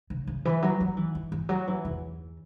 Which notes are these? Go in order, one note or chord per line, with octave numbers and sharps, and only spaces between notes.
C#3
C#3
E3
F#3
F#3
E3
E3
E3
F#3
E3
E2